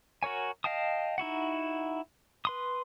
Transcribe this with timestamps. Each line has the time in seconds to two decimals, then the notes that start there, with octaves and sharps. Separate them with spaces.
0.23 F#4 A#4 C#5 G#5
0.64 D#5 F5 G5 A5 D#6
1.18 D#4 E4 F#4 F#5
2.45 B4 C6 D#6